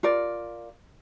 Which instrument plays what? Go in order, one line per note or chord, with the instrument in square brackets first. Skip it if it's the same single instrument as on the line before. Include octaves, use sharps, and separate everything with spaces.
[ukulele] F4 A#4 D5